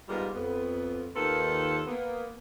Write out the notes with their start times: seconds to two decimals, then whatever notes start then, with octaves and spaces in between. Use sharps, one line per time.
0.09 G#2 G3 G#3 A#3 B3 F4
0.35 F2 B3
1.15 D#2 D#3 A#3 F4 A4 B4
1.86 A#3 B3